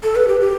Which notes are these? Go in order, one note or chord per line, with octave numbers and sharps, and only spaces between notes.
A4
B4
G4
G4